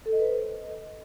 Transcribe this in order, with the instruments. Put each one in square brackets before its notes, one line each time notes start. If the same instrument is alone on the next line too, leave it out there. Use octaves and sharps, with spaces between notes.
[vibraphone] A4
D#5
B4
C5
D#5